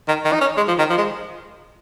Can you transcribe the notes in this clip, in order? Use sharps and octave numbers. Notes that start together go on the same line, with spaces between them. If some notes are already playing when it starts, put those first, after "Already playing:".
D#3
D#3
D#4
C#4
G#3
F3
D#3
F3
G#3